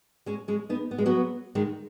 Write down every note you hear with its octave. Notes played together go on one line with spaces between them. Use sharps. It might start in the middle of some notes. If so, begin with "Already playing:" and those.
G#3 C#4
G#3 C#4
B3 D#4
B3
G#3
F#3 B3
D#3 G#3